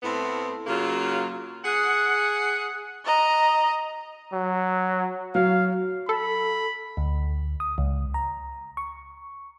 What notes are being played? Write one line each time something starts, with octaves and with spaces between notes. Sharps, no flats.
A2 A3 B3 C4
C#3 F#3 A#3 F4
G#4 F#5
D#5 A#5
F#3
F#3 F5
A4 B5
D2
D#6
C#2
A#5
C#6